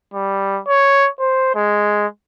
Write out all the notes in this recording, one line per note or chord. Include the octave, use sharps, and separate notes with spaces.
G3
C#5
C5
G#3